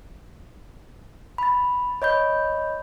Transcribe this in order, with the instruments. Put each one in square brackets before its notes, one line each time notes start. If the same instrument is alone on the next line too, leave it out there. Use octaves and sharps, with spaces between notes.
[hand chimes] B5 A6
C#5 D#5 B5 G6